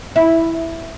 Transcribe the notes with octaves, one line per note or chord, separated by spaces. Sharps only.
E4